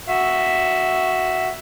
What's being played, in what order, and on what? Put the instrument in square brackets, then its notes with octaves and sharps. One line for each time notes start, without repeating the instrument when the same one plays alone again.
[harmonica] F#4 E5